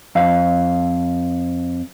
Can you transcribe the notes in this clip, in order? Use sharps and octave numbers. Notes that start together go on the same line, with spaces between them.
F2 F5